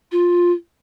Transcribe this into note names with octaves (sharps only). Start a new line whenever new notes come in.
F4